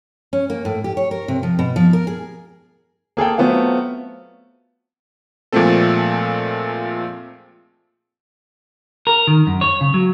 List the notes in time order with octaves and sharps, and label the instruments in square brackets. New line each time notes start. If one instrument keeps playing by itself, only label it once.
[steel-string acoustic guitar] C#4
A#3
A2
G4
C#5
A#4
C3
F3
B2
F3
A#4
G#4
[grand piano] A#3 G#4 A4 G5
F#3 A3 B3 C4 F4
[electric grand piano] A#2 F3 G#3 A3 C4 A4
[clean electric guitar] A#4
D#3
F#2
C#5
C#3
F#3